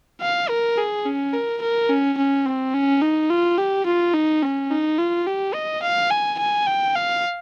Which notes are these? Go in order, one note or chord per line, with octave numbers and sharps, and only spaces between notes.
F5
A#4
G#4
C#4
A#4
A#4
C#4
C#4
C4
C#4
D#4
F4
G4
F4
D#4
C#4
D#4
F4
G4
D#5
F5
G#5
G#5
G5
F5